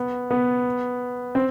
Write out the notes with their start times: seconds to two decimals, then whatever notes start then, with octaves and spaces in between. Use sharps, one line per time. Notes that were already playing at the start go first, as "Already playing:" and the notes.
Already playing: B3
0.31 B3
1.35 C4